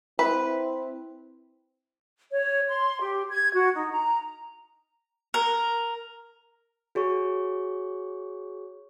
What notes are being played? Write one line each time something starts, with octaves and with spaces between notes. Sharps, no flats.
C4 E4 B4
C#5
C6
G4
G#6
F#4
D#4
A#5
A#4
F#4 G#4 C#5 C#6